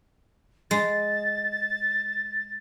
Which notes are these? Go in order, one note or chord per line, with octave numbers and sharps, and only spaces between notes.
G#3 A6